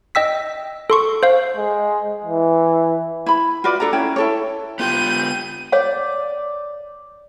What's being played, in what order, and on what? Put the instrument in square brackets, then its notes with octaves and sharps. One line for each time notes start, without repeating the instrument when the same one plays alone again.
[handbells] D#5 G5 E6 B6
A4 C6 C#6
C5 F5
[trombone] G#3
E3
[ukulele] E4 B5
F4 F#4 B4 D5
D4 A4 D5 A#5
C#4 E4 G5
E4 A4 C#5
[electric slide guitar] B3 F4 G4 [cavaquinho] B4 C5 G5 [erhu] G6 [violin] D#7
[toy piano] C#5 F5 [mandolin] D5